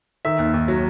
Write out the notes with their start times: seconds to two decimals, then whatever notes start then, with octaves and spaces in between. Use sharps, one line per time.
0.25 D#3 E5
0.39 D#2
0.54 D#2
0.68 F#3